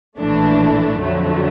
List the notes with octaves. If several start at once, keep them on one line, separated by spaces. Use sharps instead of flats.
A#1 A2 E3 A3 D4
F2 D3 F#3 A3